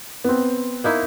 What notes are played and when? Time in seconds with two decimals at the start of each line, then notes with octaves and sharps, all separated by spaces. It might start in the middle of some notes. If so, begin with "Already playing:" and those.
0.24 B3 C4
0.84 A#3 D#4 E4